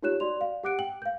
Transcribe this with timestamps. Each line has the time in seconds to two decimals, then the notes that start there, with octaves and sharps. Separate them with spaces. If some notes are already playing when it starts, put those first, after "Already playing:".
0.02 D#4 F4 G4 C#5 F#6 E7
0.20 F#4 D5 C6 F7
0.36 D5 F5
0.63 G4 F#5 D6 F#6 C#7 D7
0.79 G5 F#7
1.02 F5 G6